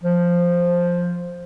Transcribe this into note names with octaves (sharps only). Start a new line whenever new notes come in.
F3